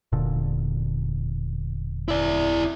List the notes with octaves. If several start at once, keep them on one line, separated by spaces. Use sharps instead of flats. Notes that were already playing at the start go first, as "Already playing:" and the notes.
E1 A#2 D3
E4 D5